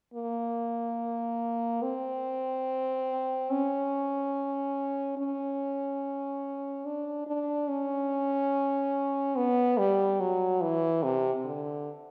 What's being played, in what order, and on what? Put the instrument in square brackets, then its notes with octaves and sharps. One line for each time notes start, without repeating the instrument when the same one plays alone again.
[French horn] A#3
C4
C#4
C#4
D4
D4
C#4
B3
G3
F#3
E3
C3
D3